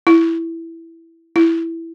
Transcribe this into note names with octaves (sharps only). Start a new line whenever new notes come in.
E4
E4